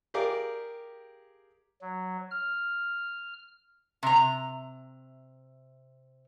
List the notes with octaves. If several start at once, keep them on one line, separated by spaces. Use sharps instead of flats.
G4 G#4 A#4 D5 F5
F#3
F6
C3 A#5